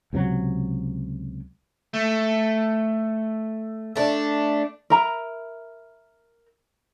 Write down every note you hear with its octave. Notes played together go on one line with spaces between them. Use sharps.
C#2 C3 F3 F#3
A3
A3 D4
A#4 E5 A#5 B5